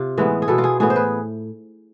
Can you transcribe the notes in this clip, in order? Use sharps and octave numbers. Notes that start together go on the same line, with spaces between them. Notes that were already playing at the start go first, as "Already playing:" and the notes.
Already playing: C3 F4
A2 E3 G#3 B3
G#4
B2 B3 A4
F4
G#4
A2 E3 B3 G#4
C5
B4